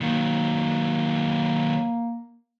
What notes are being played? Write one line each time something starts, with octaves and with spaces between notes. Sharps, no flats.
D#3 F#3 A#3